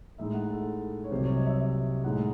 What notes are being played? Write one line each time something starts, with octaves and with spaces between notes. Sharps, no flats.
A2 G#3 D#4 E5
F#5
A4
C#5
C2 C3 F#3 C5
C#5
D#5
E5
E5
A2 G#3 D#4 F#5